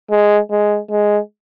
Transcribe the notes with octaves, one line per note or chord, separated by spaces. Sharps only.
G#3
G#3
G#3